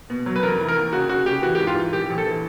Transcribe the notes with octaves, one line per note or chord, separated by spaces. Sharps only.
B2
F#3
B4
F1 A#4
E3
A#4
D#2
C#3 F#4
C#3 F#4
C#3 G4
E3 F#4
G4
G#2
F4
E3
A#1 G4
A#1
A4
E3